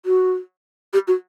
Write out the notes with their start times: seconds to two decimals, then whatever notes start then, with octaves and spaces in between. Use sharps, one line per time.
0.05 F#4
0.93 G4
1.07 F#4